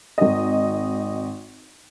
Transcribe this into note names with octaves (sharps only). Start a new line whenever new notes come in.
G#1 D#5